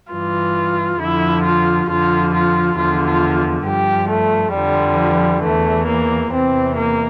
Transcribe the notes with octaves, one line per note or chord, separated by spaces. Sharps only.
G2 E3 F4
F2 D3 F3 E4
F4
F2 D3 F3 F4
F4
E2 D3 F3 F4
F4
G2 F3 G4
A3
F2 D3 F3 G3
E2 E3 A3
A#3
E2 C3 E3 C4
A#3